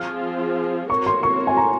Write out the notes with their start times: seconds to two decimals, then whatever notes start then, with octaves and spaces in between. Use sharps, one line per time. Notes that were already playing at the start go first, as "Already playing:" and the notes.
Already playing: F3 C4 F4 G#4 F6
0.90 C4 F#4 A#4 C#5 C#6
1.06 C6
1.23 C#6
1.47 G#5
1.57 A#5